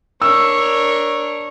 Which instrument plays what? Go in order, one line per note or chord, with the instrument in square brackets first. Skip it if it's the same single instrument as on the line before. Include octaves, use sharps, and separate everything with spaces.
[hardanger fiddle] D4 A#4 [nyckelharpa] C#5 [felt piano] E6